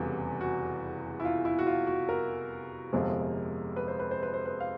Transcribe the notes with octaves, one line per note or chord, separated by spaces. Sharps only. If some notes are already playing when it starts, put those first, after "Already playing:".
Already playing: F1 E2 C#3 E3 G3 F#4
F#4
E4
F4
E4
F#4
F4
F#4
A#4
G1 F2 C3 F3 G#3
B4
C5
B4
C5
B4
C5
B4
F5